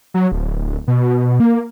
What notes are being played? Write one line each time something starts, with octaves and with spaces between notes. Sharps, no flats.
F#3
D1
B2
A#3